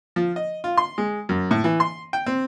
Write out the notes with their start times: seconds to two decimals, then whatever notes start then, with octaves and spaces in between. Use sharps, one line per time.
0.16 F3
0.36 D#5
0.64 F4
0.77 C6
0.98 G#3
1.29 F#2
1.51 A2
1.64 E3
1.80 C6
2.13 G5
2.26 C4